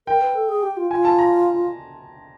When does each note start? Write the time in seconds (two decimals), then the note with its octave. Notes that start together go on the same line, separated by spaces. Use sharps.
0.07 A#4 G5
0.21 B4
0.35 A4
0.49 G#4
0.63 G4
0.77 F4
0.91 F4 G#5
1.05 A5
1.19 A#5